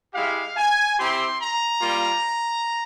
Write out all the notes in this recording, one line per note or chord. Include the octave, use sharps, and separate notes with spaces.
G#3 E4 G4 F5
G#5
C4 E4 G4 C6
A#5
G3 A#3 F4